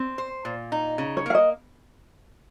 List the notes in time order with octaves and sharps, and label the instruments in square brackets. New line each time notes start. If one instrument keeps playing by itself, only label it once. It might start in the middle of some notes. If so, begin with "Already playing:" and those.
Already playing: [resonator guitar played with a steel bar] C4
C5
A#2
D#4
C#3
[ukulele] C#5
[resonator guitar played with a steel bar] A#3 [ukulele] F5
[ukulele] D#5